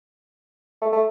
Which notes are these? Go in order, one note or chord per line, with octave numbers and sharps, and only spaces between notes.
A3
A3